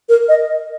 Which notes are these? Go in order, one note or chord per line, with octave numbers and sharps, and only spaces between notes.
A#4
D#5